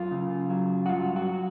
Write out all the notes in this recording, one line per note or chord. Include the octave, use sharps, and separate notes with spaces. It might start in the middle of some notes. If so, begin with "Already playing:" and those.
Already playing: F#2 F4
C#3
F#3
F#4
G2 F4
F#4